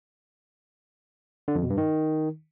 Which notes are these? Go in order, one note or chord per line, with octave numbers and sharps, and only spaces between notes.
D3
F2
B2
G2
D#3